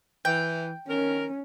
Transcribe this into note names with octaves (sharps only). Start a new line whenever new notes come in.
E3 G5
D#3 C#4 A#4